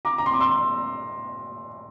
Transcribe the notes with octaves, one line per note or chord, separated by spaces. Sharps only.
A#5 D6
A#5
C6
D6
C6 E6